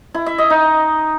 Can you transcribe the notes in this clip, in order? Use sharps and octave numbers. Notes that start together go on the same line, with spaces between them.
E4
E5
D#5
D#4